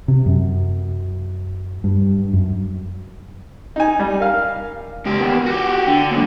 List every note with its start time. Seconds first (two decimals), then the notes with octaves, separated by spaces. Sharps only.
0.08 C3
0.26 F#2
1.84 G2
2.33 F#2
3.76 D#4 G#5
3.99 G3
4.20 A#4 F5
5.06 C#2 G4
5.20 D#2 B3
5.46 F#4 G4
5.87 D3
6.11 F#2 A#2